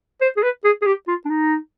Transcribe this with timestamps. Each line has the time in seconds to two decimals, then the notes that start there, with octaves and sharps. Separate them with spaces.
0.21 C5
0.37 G#4
0.43 B4
0.64 G#4
0.82 G#4
0.86 G4
1.08 F4
1.25 D4
1.30 D#4